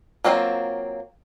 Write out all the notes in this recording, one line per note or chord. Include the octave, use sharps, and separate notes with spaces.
F#3 A#3 C4 E4 F4